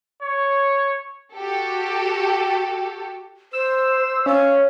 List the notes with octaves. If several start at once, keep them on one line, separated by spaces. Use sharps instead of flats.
C#5
F#4 G4 A4
C5 E6
C#4 F5